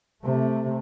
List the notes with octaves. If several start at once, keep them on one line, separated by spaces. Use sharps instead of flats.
C3 A3